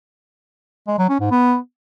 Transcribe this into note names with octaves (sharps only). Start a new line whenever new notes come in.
G#3
F#3
C#4
G#2
B3